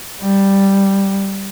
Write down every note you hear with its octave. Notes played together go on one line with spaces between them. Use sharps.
G3